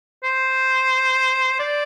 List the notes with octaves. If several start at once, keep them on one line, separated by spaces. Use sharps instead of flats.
C5
D5